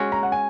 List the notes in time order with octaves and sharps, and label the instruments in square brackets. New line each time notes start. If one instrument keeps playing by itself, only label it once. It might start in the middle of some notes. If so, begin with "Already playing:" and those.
Already playing: [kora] G#3 C#4 F#4
[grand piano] A#5
F#5
G#5